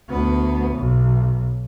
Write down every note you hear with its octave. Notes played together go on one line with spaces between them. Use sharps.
D2 B3
B1